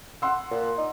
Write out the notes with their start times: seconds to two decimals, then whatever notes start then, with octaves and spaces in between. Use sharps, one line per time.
0.22 F#5 C6 E6
0.51 A#2
0.77 D#4